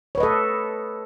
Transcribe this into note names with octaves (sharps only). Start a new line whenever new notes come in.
A4 B4 C#5 D#5